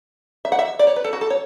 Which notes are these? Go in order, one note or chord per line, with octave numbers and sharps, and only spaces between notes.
E5
F#5
E5
D5
C#5
B4
A4
F#4
A4
C#5